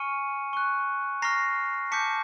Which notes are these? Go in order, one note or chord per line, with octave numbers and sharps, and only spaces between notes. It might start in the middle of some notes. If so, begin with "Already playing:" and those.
Already playing: G#5 C#6 F6 C#7 D#7
C#6 F#6
A#5 C#6 F6 A#6 C7
A5 D6 G6 B6 C#7